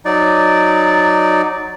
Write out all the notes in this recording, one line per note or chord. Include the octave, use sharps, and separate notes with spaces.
F#3 D#4 D5